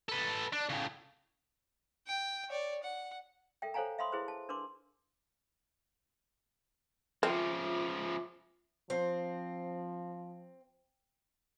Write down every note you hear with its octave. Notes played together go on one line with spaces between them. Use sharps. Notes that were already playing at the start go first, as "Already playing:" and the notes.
A4 B4
D4
A2 C#3
G5
C#5 D5
F#5
A4 A#4 E5 G5
A4 C5 C#5 F5 G#5 A#5
E5 F5 B5 C6 D#6
E4 G#4 B4 C5
A5
D4 A#4 B4 C6 D6
C#3 F3 C4 F4 E5 D6
F3 C4